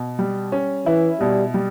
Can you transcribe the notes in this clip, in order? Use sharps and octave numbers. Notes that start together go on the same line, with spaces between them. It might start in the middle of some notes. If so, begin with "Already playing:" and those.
Already playing: B2
G3
C#4
E3 E4
B2 G3
G3